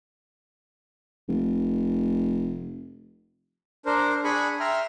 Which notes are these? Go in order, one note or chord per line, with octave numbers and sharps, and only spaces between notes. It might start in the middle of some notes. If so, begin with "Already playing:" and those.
F1
D4 A#4 C5
D4 G#4 G#5 B5 C#6
E5 G5 A#5 C6 F6